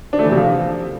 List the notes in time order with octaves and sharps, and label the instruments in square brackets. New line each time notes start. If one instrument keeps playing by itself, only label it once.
[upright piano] D4
A3
E3
C3
F3